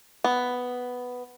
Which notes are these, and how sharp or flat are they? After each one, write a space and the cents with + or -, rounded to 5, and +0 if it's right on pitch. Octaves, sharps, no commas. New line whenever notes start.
B3 +5